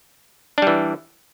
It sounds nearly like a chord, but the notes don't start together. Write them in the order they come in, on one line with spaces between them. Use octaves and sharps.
D4 G3 E3